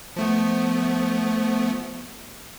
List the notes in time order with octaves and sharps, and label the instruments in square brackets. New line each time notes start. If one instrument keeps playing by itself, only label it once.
[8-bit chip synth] F3 A3 B3